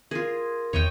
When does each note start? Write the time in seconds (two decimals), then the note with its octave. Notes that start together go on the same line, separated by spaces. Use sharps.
0.11 F4 G#4 A#4
0.73 E2 C#5 D#5 G5